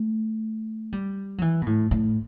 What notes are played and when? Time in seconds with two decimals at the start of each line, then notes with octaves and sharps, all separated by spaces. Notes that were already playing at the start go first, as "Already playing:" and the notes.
Already playing: A3
0.93 G3
1.38 F#3
1.42 E3
1.62 B2
1.66 A2
1.91 A2